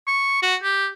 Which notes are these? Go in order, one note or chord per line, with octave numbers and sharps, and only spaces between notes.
C#6
F#4
G4